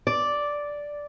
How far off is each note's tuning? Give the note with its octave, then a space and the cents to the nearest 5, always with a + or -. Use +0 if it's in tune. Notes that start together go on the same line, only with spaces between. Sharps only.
D5 -5